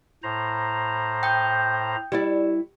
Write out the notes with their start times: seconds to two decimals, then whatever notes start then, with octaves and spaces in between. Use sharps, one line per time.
0.23 A2 C5 A#5
1.23 G5 D#6 G6
2.12 G3 E4 G4 D5